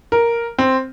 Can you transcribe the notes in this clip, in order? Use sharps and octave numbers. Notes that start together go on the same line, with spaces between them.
A#4
C4